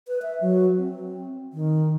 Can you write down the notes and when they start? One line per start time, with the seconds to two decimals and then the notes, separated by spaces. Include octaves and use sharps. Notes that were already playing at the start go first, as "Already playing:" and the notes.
0.08 B4
0.22 E5
0.41 F#3
0.78 C4
1.53 D#3